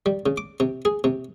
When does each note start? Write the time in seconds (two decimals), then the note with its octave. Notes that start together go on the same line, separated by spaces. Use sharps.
0.06 G3
0.26 C#3
0.38 D6
0.60 C3
0.85 G#4
1.04 C3